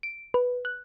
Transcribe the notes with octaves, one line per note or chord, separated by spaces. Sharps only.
D7
B4
F#6